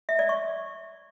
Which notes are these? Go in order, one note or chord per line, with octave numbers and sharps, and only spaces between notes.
E5
D5
C#6